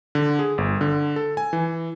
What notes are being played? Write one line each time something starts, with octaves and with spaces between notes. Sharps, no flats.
D3
G#4
G1
D3
A4
G#5
E3